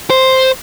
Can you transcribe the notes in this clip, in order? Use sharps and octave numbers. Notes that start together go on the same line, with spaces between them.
C5